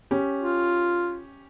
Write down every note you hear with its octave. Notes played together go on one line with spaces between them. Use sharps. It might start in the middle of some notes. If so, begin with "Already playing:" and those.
C#4 G4
F4